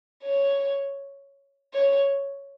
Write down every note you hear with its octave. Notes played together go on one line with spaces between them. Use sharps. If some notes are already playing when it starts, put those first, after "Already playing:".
C#5
C#5